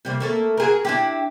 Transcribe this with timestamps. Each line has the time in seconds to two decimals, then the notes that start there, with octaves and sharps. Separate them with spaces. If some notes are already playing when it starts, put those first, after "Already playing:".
0.05 C3 G3 A#3
0.20 A3 A#3 A4
0.57 F#4 G#4 A#4
0.85 D4 E4 G4